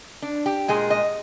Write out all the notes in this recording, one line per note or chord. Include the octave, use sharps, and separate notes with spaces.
D4
G4
A#2 G#3 G#4
D#5